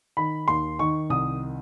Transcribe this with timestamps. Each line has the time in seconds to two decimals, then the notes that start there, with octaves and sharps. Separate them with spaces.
0.17 D#3 B5
0.48 D#2 C6
0.79 D#3 C#6
1.09 C2 D#6